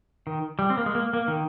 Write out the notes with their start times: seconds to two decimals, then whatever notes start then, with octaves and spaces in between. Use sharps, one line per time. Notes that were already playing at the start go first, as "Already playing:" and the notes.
0.27 D#3
0.59 G3
0.70 C4
0.77 A#3
0.86 G#3
0.95 A#3
1.13 A#3
1.28 D#3